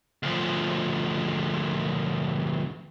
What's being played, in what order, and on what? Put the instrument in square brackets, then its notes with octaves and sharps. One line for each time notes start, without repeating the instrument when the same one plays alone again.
[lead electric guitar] D2 F3